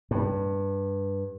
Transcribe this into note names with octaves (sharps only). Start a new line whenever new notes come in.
G2